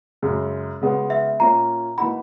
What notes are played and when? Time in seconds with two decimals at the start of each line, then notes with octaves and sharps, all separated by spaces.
0.22 F#2 C#3 G#3
0.81 C#3 G#3 B3 F#4
1.10 E5
1.40 A#2 A#3 C#4 A#5
1.98 E3 A#3 D#4 F#4 B5